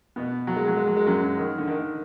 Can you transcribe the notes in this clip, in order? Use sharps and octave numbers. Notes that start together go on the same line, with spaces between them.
B2 B3
F#3
G#3
F#3
G#3
F#3
G#3
F#2 F#3
D#3
D3
D#3